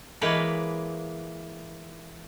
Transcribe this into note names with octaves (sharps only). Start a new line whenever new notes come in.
E3 G#3 A#3 B4 C#5 G5